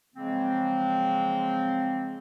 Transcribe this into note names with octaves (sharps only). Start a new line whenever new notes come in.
C#3 F3 F#3 G#3 A#3 C4